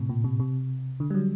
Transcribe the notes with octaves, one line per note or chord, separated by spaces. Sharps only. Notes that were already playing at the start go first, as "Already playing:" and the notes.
Already playing: A2 C3
A#2
C3
C3
D3
G3
F#3